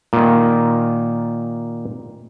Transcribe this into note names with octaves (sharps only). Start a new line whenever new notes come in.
A#2 D#3